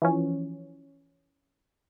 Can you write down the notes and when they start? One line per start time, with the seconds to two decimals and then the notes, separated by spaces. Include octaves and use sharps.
0.02 E3 F3 C#4